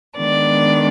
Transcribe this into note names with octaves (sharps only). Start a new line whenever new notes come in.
D#3 G#3 B3 D4 D5